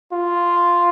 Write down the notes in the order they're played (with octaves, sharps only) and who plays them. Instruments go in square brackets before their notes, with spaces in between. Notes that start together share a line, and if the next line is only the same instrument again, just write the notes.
[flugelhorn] F4